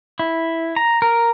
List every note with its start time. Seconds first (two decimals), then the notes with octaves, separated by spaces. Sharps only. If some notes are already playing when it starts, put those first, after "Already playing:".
0.19 E4
0.76 A#5
1.02 A#4